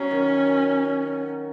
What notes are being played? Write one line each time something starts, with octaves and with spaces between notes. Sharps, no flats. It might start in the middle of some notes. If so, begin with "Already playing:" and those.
Already playing: F#3 C#4
D#3